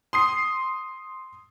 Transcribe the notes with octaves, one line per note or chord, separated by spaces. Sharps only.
C6 D#6 C7